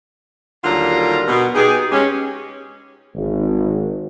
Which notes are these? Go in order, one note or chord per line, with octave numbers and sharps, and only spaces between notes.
D#2 D3 F#3 G3 F4 A#4
B2
B3 D#4 G4 G#4
G#3 C#4 G4
G#1